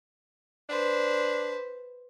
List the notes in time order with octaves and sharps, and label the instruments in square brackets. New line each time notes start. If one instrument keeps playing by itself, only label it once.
[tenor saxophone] D4 [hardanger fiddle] B4 C5